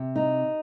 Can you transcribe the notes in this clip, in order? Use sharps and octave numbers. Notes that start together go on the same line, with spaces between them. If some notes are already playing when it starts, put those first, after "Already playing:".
Already playing: C3
D#4